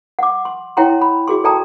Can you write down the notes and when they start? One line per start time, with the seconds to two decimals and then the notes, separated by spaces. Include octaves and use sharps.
0.19 F#5 D6
0.45 C6
0.77 E4 C#5 F#5 G5 A#5 C6
1.02 B5
1.28 F#4 G#4 C6
1.44 A4 D5 G5 A5 A#5 D#6